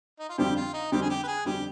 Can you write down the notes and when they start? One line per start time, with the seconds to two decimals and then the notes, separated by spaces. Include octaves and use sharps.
0.20 D#4
0.29 F4
0.38 F2 D3 G3 C4 G4
0.56 F4
0.73 D#4
0.92 F2 D3 G3 C4 G4
1.01 G#4
1.09 G4
1.23 B4
1.27 G#4
1.45 F2 D3 G3 C4 G4